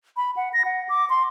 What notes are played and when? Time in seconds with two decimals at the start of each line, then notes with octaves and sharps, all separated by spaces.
0.17 B5
0.37 F#5
0.53 A#6
0.65 F#5
0.89 D6
1.10 C6